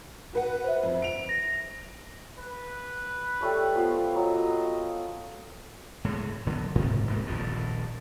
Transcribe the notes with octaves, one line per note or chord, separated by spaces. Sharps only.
F#4 B4 F#5
C5 E5
F2
D7 F7
A#6
B4
G3 A3 C#5
F3 B3 C5
F#3 D#5
F5
A2 G#3
D3 F#3 B3
G#2 C3
D#1 G#2 A#3
D#1 A#1 F2 A2